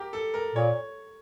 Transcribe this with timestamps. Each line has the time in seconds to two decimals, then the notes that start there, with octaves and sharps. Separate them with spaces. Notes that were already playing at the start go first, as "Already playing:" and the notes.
Already playing: G4 A#4
0.13 A4
0.34 A#4
0.55 A#2 C#5